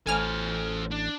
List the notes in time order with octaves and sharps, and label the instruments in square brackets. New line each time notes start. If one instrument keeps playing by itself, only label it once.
[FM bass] A1 [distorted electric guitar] A4 C5 [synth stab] G#5 F6
[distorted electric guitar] D4